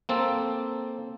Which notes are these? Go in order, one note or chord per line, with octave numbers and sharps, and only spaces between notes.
A#3 C4 A4